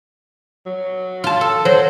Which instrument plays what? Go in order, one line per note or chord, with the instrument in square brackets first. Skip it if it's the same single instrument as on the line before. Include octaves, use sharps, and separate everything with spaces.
[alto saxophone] F#3
[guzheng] F4 A5
A4
[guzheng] F#3 [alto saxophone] C5